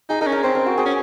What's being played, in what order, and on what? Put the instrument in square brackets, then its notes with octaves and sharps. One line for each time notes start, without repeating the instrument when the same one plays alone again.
[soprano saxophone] D#4 [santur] G#4
[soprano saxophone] D#4 [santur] A#4
[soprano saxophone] C#4
[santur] A#4
[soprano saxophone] C4 [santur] C5
[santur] A#4
F#4
[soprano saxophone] C4 [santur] G#4
[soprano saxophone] C#4